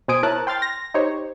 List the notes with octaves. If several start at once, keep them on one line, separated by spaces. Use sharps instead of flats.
B2 C5 G#5 D#6 D7
E4 A#4 C#5 A5 F#6
G5 C6 F6 A6
A#6
D#4 G4 C5 C#5